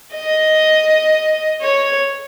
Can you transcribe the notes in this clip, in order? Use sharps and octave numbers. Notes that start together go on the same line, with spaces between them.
D#5
C#5